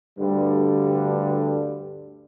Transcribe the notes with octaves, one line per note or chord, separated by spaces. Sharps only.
D2 G2 D3 G3